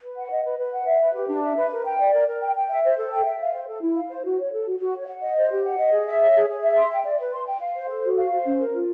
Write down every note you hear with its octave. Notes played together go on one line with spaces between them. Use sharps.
B4
F#5
D#5
B4
B4
F#5
E5
B4
G4
D4
E5
B4
A#4
G5
D5
A#4
A#4
G5
G5
E5
C5
A4
G5
E5
F5
C5
A4
E4
F5
C5
F#4
C#5
A4
F#4
F#4
C#5
F#5
D#5
C5
G4
F#5
D#5
G#4
E5
C#5
G#4
G#4
E5
C6
G5
D5
B4
C6
G5
F5
C5
A4
F#4
F5
C5
C#4
A#4
F4